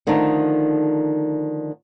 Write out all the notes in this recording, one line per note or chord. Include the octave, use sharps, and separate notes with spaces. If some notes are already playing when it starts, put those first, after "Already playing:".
D3 D#3 F3 A3 D4 D#4